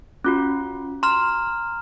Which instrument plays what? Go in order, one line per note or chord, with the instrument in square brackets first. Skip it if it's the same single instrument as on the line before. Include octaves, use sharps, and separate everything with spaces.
[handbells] C#4 F4 F#4
[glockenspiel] A#5 F6 [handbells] C6